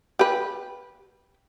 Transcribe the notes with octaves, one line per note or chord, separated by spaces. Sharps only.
G4 B4